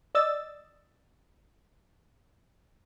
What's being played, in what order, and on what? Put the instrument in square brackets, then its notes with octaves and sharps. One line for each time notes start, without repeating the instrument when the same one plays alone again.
[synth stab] D5 D#5 E6 A6